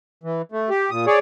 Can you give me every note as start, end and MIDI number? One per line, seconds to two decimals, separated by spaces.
0.24 0.42 52
0.52 0.70 57
0.70 0.90 67
0.91 1.06 46
0.91 1.06 87
1.07 1.19 68
1.07 1.19 73
1.07 1.19 74